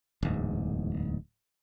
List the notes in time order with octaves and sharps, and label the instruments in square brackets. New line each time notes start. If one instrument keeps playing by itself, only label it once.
[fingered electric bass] D1 E2 G#2